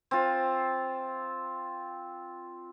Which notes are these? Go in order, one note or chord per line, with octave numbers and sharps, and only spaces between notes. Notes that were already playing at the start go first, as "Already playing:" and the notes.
C4 F4